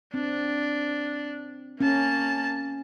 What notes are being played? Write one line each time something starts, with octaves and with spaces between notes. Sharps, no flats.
C4 D4
A#3 C#4 A5